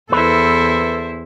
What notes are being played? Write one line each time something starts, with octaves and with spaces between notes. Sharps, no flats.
E2 E4 A4 B4 C5